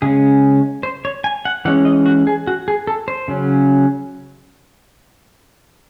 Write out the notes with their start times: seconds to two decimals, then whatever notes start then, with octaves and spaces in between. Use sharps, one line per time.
0.02 C#3 G#3 C#4 G#4
0.83 C5
1.05 C#5
1.24 G#5
1.45 F#5
1.65 E3 G#3 C#4 F#5
1.85 D#5
2.06 F#4
2.27 G#4
2.47 F#4
2.68 G#4
2.87 A4
3.08 C5
3.28 C#3 F#3 C#4